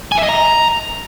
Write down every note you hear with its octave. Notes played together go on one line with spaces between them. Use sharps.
G#5
E5
D#5
A#5